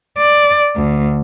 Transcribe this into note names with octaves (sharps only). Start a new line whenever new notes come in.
D5
D2